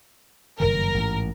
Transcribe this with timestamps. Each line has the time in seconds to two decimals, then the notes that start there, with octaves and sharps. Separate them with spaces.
0.60 F#1 G2 D#3 A#4
0.94 A1 G#2